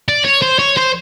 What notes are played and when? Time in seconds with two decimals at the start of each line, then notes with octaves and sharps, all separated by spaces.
0.09 D5
0.25 C#5
0.42 C5
0.59 C#5
0.77 C5